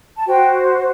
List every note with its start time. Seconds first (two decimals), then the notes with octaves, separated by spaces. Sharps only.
0.16 A5
0.27 F#4 C5 G5